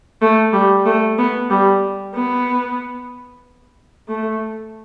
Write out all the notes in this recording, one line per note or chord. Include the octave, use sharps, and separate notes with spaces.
A3
G3
A3
B3
G3
B3
A3